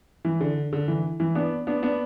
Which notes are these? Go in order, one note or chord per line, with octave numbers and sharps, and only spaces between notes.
E3
D3
D3
E3
E3
B3 D4
B3 D4
B3 D4